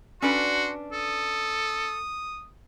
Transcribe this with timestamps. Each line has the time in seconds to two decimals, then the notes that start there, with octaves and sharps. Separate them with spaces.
0.22 C#4 D4 F#4 B4 C6
0.93 A4 D#6